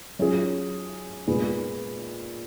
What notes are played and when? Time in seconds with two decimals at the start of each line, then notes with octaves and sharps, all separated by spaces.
0.19 F#3 C#4 F4 G#4
1.27 A#2 G#3 B3